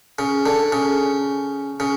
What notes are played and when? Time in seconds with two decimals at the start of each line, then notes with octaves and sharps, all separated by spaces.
0.19 C#3
0.46 D3
0.72 C#3
1.80 C#3